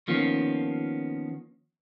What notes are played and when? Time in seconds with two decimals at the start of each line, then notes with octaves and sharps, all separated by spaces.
0.08 D#3 F3 A#3 B3 C#4